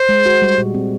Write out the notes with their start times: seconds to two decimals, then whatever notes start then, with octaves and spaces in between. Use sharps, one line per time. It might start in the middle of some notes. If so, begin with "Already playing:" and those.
Already playing: C5
0.09 G#3
0.26 F#4
0.42 G3
0.58 A#2
0.74 C4